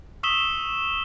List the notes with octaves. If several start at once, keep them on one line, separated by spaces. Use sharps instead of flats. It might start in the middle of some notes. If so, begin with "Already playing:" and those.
C#6 D#6 E6 B6 E7 G7